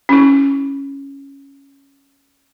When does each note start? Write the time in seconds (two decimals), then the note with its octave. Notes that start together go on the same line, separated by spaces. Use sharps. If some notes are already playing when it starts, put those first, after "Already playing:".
0.09 C#4 E4